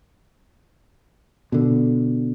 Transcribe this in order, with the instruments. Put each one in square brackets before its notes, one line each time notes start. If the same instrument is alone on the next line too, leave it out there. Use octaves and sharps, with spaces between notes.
[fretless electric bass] B2 D3